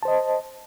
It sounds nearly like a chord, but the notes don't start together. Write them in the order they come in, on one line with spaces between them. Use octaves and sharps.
A5 C5 D#5